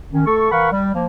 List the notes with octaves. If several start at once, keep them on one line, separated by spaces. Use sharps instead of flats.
D#3 C#4
A3 A4 C#6
E3 A#4 F5 F#5 B5 C#6
G3
F3 A#3